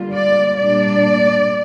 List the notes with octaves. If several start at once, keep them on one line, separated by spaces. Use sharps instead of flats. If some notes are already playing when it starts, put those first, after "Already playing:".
Already playing: D3 G3 A#3 F4
D5
A#2 G3 A#3 D4 D5